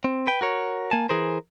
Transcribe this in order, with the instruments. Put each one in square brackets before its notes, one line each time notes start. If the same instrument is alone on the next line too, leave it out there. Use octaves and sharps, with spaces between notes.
[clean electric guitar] C4
B4 G5
F#4 A#4 C#5
A#3 G#5 A5
E3 G#4 A#4 C5